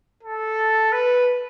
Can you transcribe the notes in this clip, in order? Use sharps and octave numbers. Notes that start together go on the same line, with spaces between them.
A4
B4